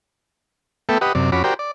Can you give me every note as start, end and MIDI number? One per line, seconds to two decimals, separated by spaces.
0.89 0.98 57
0.89 0.98 59
0.89 0.98 69
0.89 0.98 76
0.89 0.98 79
1.01 1.13 67
1.01 1.13 71
1.01 1.13 75
1.01 1.13 78
1.15 1.30 42
1.15 1.30 48
1.15 1.30 74
1.32 1.43 41
1.32 1.43 61
1.32 1.43 66
1.32 1.43 83
1.32 1.43 86
1.44 1.54 66
1.44 1.54 67
1.44 1.54 70
1.44 1.54 72
1.44 1.54 74
1.44 1.54 79
1.59 1.71 74